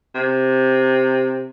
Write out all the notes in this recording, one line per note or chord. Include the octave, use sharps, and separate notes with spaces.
C3